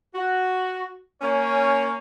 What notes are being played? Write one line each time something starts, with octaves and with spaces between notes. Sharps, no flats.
F#4
A#3 C#4 C#5